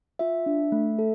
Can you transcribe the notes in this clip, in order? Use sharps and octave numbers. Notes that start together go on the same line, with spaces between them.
F4 E5
D4
A3
A4